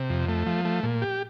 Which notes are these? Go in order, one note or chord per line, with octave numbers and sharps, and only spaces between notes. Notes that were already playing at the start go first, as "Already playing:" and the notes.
Already playing: C3
F2
A3
F3
A3
A#2
G4